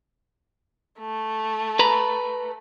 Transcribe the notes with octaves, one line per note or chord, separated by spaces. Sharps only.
A3
B4 A#5 B5